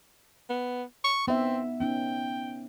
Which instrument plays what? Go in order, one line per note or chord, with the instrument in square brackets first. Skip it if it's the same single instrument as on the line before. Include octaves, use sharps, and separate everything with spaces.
[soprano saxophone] B3
C#6
[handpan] B3 D#4 E5 [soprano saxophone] C4
[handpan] B3 C#4 D#4 [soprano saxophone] G5